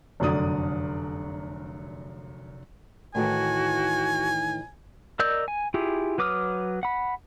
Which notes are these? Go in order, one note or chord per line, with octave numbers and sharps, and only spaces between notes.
F1 F#2 D3 D5 D#6
A2 D#3 E3 F#4 G#5
A#4 D5 D#5 E6 G6
G#5
E4 F4 G4 G#4
F#3 B4 D6 D#6 F6
F#5 B5